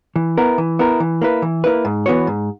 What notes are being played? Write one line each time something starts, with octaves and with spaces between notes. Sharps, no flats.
E3
B3 E4 A#4
E3
B3 E4 A#4
E3
A#3 E4 B4
E3
A#3 E4 B4
G#2
E3 B3 F#4 C#5
G#2